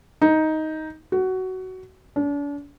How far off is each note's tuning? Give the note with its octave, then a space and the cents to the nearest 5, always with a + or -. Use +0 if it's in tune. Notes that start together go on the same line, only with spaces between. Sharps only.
D#4 +10
F#4 +15
D4 -40